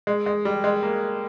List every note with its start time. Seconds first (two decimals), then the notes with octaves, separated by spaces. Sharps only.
0.07 G#3
0.26 G#3
0.45 G3
0.64 G#3
0.83 A#3